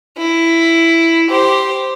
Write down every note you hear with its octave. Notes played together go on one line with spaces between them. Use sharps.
E4
G4 C5